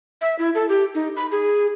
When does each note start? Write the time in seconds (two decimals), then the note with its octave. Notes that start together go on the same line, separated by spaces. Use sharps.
0.21 E5
0.39 E4
0.55 A4
0.69 G4
0.95 D#4
1.16 B5
1.31 G#4